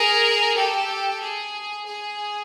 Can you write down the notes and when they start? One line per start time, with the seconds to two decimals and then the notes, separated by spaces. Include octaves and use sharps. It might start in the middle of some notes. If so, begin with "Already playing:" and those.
Already playing: G#4 A#4
0.56 G4 A4
1.21 G#4
1.86 G#4